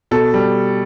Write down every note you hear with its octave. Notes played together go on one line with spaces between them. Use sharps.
B2 A4
G3